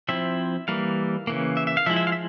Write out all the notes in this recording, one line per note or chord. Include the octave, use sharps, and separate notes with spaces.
F3 C4 E4 E5
E3 G3 A#3 F5
C#3 E3 A#3
E5
E5
F5
F3 G#3 E4 E5
E5
F5
E5